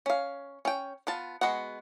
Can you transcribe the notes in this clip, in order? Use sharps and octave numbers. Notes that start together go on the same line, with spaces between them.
C#4 F5
C#4 G5
B3 F4 A5
G#3 B3 F#4 F#5